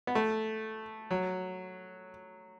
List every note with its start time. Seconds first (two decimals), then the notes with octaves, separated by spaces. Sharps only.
0.07 B3
0.15 A3
1.11 F#3